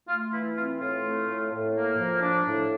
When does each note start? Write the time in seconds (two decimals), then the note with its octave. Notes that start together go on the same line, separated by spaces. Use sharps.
0.08 A3 F4
0.32 E3 E4
0.55 C4 F4
0.79 A2 F4
1.03 A3
1.27 A2
1.50 A2
1.74 A#3
1.97 F3
2.21 D4
2.45 A2